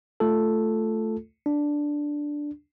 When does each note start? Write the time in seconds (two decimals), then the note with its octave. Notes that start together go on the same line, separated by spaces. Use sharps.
0.20 A3 F4 A4
1.46 D4